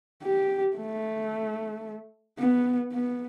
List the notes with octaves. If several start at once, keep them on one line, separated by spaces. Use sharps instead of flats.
G4
A3
B3
B3